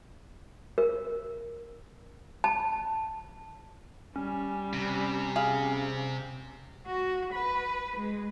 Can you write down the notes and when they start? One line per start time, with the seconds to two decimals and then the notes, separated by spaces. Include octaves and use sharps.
0.78 A#4
2.44 A5
4.16 G3 C#4
4.73 C3
5.36 G#4 F5
6.86 F#4
7.33 B4
7.96 G#3